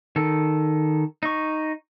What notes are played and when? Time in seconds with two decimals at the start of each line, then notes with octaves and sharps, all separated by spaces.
0.16 D#3 A4
1.23 D#4 C#6